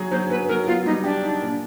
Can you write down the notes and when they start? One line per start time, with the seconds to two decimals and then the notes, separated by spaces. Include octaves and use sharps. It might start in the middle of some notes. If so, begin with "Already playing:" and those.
Already playing: F#3 G#4
0.11 F#3 C5
0.30 F#3 B4
0.48 F#3 A#4
0.67 B3 F4
0.86 G3 D#4
1.04 D4 G4
1.23 D#4
1.41 A#2